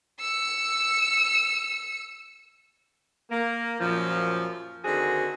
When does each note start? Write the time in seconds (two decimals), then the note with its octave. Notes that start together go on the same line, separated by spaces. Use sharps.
0.20 E6 C#7
3.31 A#3
3.80 F#2 A#2 F3
4.85 D3 D#3 C4 F#4 G#4